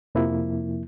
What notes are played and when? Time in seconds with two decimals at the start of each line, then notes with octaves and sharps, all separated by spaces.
0.15 F2 C3 F3 A#3 E4